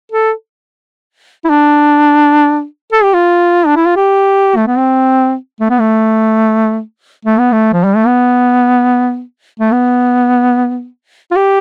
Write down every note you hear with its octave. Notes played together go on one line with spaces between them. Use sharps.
A4
E4
D4
A4
G4
F4
D4
E4
F4
G4
A3
B3
C4
A3
B3
A3
A3
B3
A3
F3
G3
A3
B3
A3
B3
F4
G4